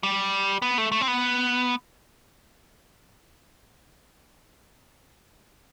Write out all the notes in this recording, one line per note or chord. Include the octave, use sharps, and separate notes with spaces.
G3
B3
A3
A3
C4
B3